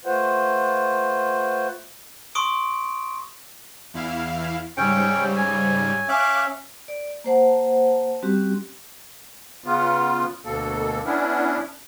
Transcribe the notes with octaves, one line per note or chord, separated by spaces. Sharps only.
A3 F4 B4 C5 F#5
C6 C#6 D#6 D7
E2 E4 F5
G#2 C#3 G3 C#4 C#5 G5 C#6 E6
G#5
C#4 E5 F5 D6 F#6
D5
A#3 C5 F#5 A5
G3 C4 C#4 F#4 G4
C#3 B3 F4
D2 B2 A#3 A4
B3 C#4 D4 E4